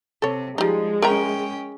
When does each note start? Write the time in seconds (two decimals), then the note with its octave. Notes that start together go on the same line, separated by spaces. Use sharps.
0.22 C3 A4 C#5
0.58 F3 G3 G#3 D#4
1.02 C#4 A#4 E5 G5 A#5